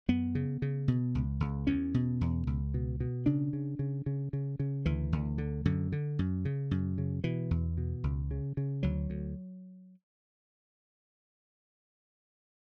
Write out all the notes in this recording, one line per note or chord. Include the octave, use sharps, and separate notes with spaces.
F#2 B3
C#3
C#3
B2
C#2
C#2
E2 C#4
B2
E2
C#2
B2
B2
C#3 D4
C#3
C#3
C#3
C#3
C#3
D2 E3
D2
D3
F#2 D3
D3
F#2
C#3
F#2
C#3
B2 E3
E2
B2
C#2
C#3
C#3
D2 F#3
D2